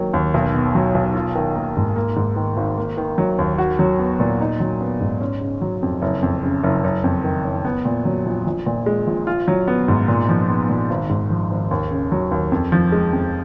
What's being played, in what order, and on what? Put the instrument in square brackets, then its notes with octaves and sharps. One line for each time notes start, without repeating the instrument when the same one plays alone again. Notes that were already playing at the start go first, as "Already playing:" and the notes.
Already playing: [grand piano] D#3 F#3 A#3
D#2
B1
B2
F#3
B1
F4
D#3
A#3
G#2
A#3
G#2
D#3
G#1
A#3
D#3
F#3
D#2
F#4
F#3
B3
A#2
D#4
F#3
B3
G#2
C#4
C#3
F#3
F2
F#1
F2
C#3
F#1
F#1
F2
D#3
F#1
B3
A#2
F#3
A#1
A#1
A#2
G#3
A#1
F4
F#3
B3
G#2
A#2
F3
B3
A#2
G#1
G#2
F3
G#1
D#2
C#3
F#3
D#2
F2
F3
G#3
F2